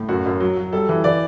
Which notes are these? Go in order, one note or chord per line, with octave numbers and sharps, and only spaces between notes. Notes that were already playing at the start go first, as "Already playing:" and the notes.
Already playing: A2
F#2 F#4
F#2
F#3
F#3
G3 A4
E3
E3 D5